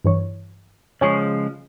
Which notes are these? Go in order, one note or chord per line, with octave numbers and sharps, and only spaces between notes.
G2 E3 C#5
C#3 F3 G#3 C#5 G#5 C#6